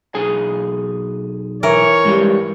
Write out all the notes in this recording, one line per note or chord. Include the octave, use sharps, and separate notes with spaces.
B1 G#4 G#5
E3 A#4 C#5
G#2 G3 G4